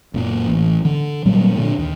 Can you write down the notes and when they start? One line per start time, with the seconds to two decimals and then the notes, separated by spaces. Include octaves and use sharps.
0.14 F#1 A#2 A#3
0.46 A1
0.85 D3
1.25 A#2 F#3 G3 A#3
1.56 A#2 D3
1.78 D#2